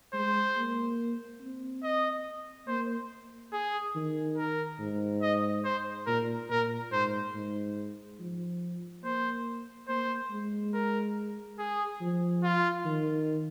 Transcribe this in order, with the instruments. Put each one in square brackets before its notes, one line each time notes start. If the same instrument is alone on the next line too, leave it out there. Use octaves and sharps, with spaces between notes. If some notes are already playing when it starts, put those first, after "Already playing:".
[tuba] G#3 [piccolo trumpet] C5
[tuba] A#3
C4
[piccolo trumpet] D#5
[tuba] A#3 [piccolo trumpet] C5
[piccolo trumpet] G#4
[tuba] D#3
[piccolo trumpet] A#4
[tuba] G#2
[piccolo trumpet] D#5
C5
[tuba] A#2 [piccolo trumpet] A#4
[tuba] A#2 [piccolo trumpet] A#4
[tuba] G#2 [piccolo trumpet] C5
[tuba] G#2
F3
[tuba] A#3 [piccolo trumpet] C5
[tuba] A#3 [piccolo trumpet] C5
[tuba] G#3
[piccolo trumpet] A#4
G#4
[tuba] F3
[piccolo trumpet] F4
[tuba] D#3